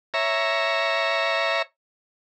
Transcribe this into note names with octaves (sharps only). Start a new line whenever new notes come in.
C#5 E5 A#5